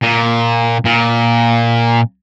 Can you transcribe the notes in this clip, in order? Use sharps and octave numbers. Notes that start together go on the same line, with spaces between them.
A#2
A#2